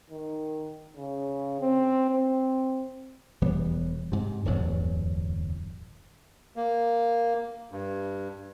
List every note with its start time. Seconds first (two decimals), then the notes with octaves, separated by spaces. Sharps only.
0.10 D#3
0.96 C#3
1.61 C4
2.10 C4
3.41 E1 E3 G3 B3
4.12 G#2 C3
4.45 D1 G1 E2 F#3
6.56 A#3
7.72 G2